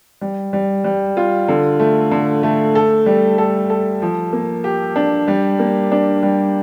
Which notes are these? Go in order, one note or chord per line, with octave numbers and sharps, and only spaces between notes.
G3
G3
G3
F4
D3
A3
D3
A3
A4
G3
A4
A4
F3
A#3
G4
D4
G3
A#3
D4
G3